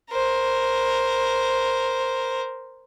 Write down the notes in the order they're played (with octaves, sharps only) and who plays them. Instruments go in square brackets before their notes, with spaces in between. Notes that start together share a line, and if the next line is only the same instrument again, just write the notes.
[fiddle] A#4 C5